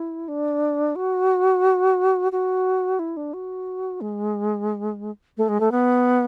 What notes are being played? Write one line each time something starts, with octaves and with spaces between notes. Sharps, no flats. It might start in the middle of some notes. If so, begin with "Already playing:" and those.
Already playing: E4
D4
F#4
F#4
E4
D4
F#4
G#3
A3
G#3
A3
B3